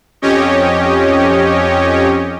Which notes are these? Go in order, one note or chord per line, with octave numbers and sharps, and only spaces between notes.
F2 C#4 G4 C#5 D#5